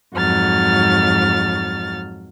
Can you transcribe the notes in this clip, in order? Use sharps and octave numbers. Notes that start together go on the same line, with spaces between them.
F2 G#2 F#3 F6 A6